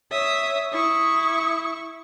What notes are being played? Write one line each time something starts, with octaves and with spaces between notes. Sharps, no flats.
C#5 E5 D#6
E4 C#6 D#6